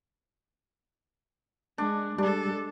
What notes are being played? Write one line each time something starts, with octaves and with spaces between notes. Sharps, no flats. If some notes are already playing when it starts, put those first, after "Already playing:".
G#3 D4
G3 G#3 D4 A4